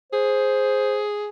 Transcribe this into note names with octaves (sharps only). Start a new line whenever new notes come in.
G#4 C5